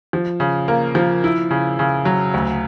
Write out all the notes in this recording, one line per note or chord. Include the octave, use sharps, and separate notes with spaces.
F3
C#3
A#3
F3
E4
C#3
C#3
F#3
D2